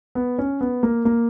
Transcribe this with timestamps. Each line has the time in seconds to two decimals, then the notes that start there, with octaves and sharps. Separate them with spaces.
0.15 B3
0.39 C#4
0.61 B3
0.83 A#3
1.05 A#3